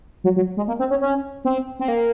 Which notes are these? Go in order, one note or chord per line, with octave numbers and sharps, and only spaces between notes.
F#3
F#3
G#3
A#3
C4
C#4
C#4
C4
C4
A#3